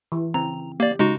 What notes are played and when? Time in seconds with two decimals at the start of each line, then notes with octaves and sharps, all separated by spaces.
0.12 E3
0.34 C#3 C4 A#5
0.80 A#3 G4 D5
0.99 C#3 G#3 D#4 F#4